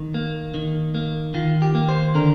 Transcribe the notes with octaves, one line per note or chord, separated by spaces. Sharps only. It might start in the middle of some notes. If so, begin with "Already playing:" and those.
Already playing: D#3
A#3
D#3
A#3
D#3 F4
G4
A#3
C5
D3 A#4